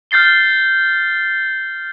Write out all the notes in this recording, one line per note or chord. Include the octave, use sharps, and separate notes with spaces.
F6 G6 A6 C7 G7